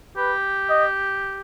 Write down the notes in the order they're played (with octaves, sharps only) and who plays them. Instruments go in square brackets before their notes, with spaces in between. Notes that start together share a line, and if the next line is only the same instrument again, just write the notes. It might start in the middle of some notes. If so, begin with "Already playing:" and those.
[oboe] G4 [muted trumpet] B4
[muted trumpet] D#5